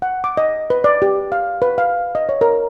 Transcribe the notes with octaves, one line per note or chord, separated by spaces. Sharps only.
F#5
D6
D#5
B4
D5
G4
F5
B4
F5
D#5
C#5
A#4